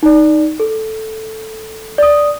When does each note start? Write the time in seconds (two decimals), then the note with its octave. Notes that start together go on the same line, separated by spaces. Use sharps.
0.03 D#4 D5
0.60 A4
1.98 D5 D#6